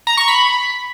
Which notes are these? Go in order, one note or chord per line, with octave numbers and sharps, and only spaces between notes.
A#5
C#6
B5